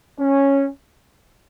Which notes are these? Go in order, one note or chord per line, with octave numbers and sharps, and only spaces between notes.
C#4